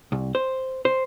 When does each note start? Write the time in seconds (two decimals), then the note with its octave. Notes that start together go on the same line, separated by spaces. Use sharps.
0.12 C2
0.35 C5
0.85 C5